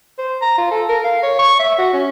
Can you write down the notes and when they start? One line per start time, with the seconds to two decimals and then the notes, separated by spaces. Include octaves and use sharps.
0.18 C5
0.42 A#5
0.58 F4
0.71 A4
0.89 A#4
1.04 F5
1.23 C#5
1.39 C#6
1.59 E5
1.78 F#4
1.93 C#4